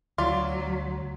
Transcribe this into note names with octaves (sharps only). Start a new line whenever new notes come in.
D2 F#3 F4 D5